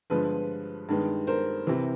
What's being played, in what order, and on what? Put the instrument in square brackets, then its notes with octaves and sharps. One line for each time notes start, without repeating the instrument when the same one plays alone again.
[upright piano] G2 D3 F3 G#3 B3 B4
G2 D#3 G#3 B3
A#4 C5
C3 E3